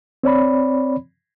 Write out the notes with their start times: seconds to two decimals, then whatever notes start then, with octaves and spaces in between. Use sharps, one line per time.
0.23 C4 C#5 D5 B5